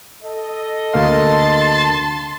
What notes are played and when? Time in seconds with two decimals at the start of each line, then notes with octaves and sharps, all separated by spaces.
0.24 A4 D#5
0.94 D2 A#3 F5 A5 C6